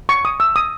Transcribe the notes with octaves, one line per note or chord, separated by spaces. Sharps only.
C#6
D#6
E6
D#6